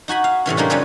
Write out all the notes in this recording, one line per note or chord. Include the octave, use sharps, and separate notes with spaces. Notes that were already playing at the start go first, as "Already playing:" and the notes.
D#4 F#4 G#5 B5
F5
A2 C3 E3 C#4
G3 G#3 A#3 D4 D#4 F4
F#2 C#3 G3 C4 G#4 B4